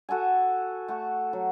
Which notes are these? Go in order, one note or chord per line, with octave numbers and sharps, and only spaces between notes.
F#4 A4 F#5 G#5
A3 F#4
F#3